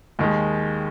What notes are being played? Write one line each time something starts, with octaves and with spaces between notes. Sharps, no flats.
D#2 D#3 G#3